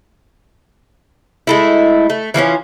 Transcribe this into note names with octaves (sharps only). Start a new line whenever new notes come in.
G#3 A3 E4
A3
E3 F3 A3 C#4